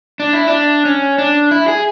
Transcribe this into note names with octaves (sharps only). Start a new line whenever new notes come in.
D4
E4
D4
C#4
D4
E4
G#4